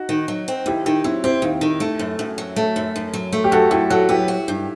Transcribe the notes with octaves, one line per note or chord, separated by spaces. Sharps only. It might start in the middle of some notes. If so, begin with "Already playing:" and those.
Already playing: D#4 F#4
D#3
F#3
C4
D#2 E4 G4
D#3 E4 G4
F#3 C4 E4
C4 E4 G4
D#2
D#3
A3
F#2
F#2
F#3
A3
F#2
F#2
F#3
A3
G4
F#2 F#4 A4
F#2 E4 G4
F#3 F#4 A4
B3 E4 G4
F#4
G2